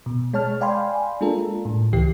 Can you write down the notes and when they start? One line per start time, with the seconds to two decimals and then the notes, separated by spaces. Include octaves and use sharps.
0.06 B2
0.34 G#3 C#5 A5 F6
0.61 D5 F5 G5 G#5 B5 C6
1.21 G#3 A#3 D4 F4 A4 A#4
1.65 A2
1.93 C#2 E3 G4 C7